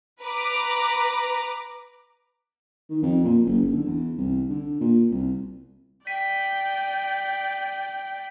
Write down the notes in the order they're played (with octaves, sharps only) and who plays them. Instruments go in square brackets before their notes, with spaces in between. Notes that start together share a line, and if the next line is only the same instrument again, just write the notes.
[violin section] B4 A#5 D6
[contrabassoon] D#3
F2
A#2
F#1
F#1
D3
E2
C2
D3
A#2
C2
[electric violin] D5 G5 [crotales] B6 D#7